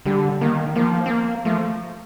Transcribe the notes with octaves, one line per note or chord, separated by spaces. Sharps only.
D3 G3
D#3 A#3
F3 A#3
C4
A#3
F3 A3